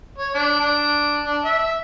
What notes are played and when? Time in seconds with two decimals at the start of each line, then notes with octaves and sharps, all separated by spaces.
0.18 C#5
0.34 D4
0.60 D4
1.24 D4
1.45 E5